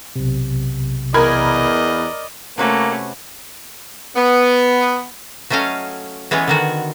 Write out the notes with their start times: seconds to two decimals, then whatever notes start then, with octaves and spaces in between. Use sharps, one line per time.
0.16 B1 C3
1.14 E2 A#4 D5 D#5 B5 G#6
2.58 C3 A3 A#3 C#4 F#4 B4
4.15 B3
5.50 F#3 A3 C#4 D#5 F5
6.31 E3 G#3 B3 C#4
6.48 D3 D#3 F#4